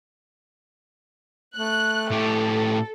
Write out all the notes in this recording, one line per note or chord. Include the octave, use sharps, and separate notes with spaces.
A3 F#6
A2 G4 A4